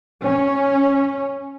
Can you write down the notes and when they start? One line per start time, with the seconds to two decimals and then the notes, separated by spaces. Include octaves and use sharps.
0.22 C#4